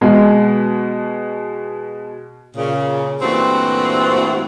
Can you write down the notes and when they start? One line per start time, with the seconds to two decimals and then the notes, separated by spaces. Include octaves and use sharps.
0.01 B2 G#3
2.56 A#2 C#3
3.22 G2 A#2 E3 A3 C4 F#4